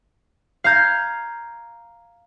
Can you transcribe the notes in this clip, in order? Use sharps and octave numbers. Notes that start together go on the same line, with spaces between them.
F5 A#5 G6 G#6